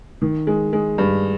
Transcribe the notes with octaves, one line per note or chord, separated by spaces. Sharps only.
D#3
G#3
G#3
G2